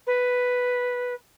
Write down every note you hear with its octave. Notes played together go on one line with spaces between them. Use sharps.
B4